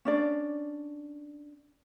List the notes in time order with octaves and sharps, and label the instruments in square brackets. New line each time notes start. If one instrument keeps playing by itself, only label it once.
[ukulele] C#4 D4 D5